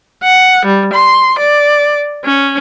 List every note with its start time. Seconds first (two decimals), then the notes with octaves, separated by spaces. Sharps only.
0.24 F#5
0.66 G3
0.94 C6
1.39 D5
2.25 C#4